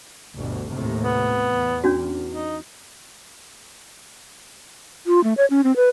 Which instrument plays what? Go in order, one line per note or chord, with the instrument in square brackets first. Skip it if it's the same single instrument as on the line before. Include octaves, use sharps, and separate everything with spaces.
[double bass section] G1 D2 B2
D#2 A2 C3
[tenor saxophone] B3
[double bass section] E2
[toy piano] C#4 D4 F#4
[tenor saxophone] D#4
[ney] F4
A3
C#5
C#4
C4
B4